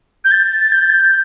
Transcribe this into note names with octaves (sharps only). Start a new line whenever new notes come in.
G6
A6
G6
A6
G6